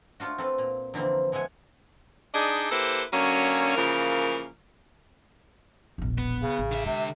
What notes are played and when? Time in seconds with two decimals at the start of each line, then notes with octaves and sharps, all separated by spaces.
0.20 A3 D4 F4 F#4
0.38 C4 A4 B4
0.58 A#2
0.94 F2 D3 E3 A#3 C4
1.32 F3 G#3 E5 F#5 G#5
2.34 D4 D#4 G#4 D5 D#5
2.71 A#3 E4 G4 A4 B4 C5
3.13 D3 F#3 A#3 C#4
3.77 C#3 E3 F3 A#3 A#4
5.98 E1 A#1
6.18 B3
6.43 C#3
6.58 A1
6.72 D3 E5
6.86 C3 G#3